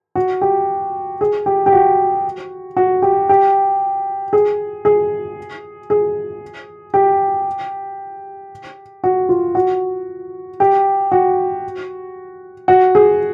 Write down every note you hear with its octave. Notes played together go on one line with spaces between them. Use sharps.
F#4
G4
G#4
G4
G4
F#4
F#4
G4
G4
G#4
G#4
G#4
G4
F#4
F4
F#4
G4
F#4
F#4
G#4